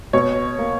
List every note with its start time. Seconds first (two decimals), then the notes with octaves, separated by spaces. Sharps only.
0.13 B2 C#5
0.59 A#3